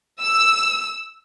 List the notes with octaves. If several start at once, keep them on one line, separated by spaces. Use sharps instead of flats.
E6